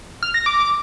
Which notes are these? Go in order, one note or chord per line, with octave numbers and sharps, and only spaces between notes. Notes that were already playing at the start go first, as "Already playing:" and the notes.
F6
A#6
D6